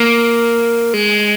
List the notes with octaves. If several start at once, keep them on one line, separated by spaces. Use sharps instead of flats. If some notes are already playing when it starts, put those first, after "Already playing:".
Already playing: A#3
G#3